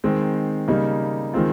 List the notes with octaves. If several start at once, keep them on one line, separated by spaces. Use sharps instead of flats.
D#3 G#3 C4
C#3 G3 A#3 D#4
D#3 G#3 C4 F4